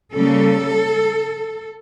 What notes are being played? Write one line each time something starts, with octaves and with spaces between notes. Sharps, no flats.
C#3 G3 A#3 A4